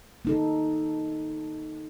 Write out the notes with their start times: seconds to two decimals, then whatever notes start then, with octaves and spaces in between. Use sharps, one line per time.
0.25 A#3 D#4 A4